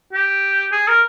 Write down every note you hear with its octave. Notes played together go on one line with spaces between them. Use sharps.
G4
G#4
A#4